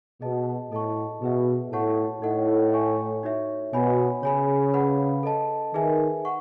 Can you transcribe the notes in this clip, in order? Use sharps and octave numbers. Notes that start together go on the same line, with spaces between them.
B2 G#4 D#5 A5
A2 A4 D#5 A5 C#6
B2 G#4 B4 E5
A2 A4 C#5 F#5 A5 C#6
A2 D#4 A4 D#5 F#5
C#5 G#5 C#6
D#4 F#4 C#5 E5
B2 C#5 G#5 B5
C#3 C#5 G#5 B5
B4 F#5 B5
A4 D#5 A5
D#3 D#4 G#4 B4 E5 G#5
F#5 C#6